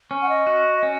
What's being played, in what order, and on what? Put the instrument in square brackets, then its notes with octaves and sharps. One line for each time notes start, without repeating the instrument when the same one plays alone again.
[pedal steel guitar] C#4
[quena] F#5
D#5
[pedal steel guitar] F#4
C#4